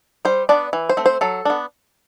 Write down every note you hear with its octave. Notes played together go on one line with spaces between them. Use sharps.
G3 C5
B3 D4 D5
E3
C5
A3 C4
C5
F#3 A4
B3 D4